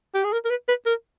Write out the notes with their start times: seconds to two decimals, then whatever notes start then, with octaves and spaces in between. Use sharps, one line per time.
0.15 G4
0.24 G#4
0.33 A#4
0.45 A#4
0.50 B4
0.68 B4
0.86 A#4